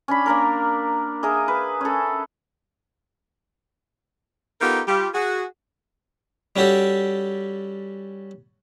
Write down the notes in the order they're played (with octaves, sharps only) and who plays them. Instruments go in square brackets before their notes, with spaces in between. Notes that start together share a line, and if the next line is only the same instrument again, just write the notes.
[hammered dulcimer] C#4 D4 B5
A#3 D4 A#4
G#4 A#4 D#5 E5
B4
C#4 A4
[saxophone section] B3 D#4 F4 G4 A4 A#4
G3 F4 G4
F#4 G#4
[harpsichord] G3 C#4 F#4 G4 A4